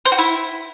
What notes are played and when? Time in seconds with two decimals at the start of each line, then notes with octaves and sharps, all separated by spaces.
0.05 C5
0.12 F#4
0.18 E4